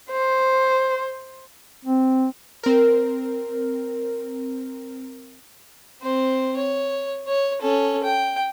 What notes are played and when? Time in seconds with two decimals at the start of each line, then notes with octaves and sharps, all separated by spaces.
0.10 C5
1.85 C4
2.63 C4 A#4
6.01 C4 C5
6.56 C#5
7.27 C#5
7.61 C#4 A4
8.03 G5